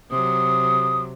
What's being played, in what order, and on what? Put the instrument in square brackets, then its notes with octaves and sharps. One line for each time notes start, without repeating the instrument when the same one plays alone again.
[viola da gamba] C3 F#3 [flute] D#6